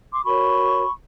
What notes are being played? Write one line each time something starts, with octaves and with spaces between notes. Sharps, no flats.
C6 D6
F#4 A#4 C#5 B5 C#6